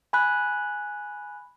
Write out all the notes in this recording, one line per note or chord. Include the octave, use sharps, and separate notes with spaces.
G#5 B5 F#6